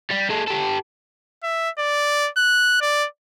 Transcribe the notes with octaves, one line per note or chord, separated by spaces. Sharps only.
G3
G#3 A4
G4 A4
E5
D5
F#6
D5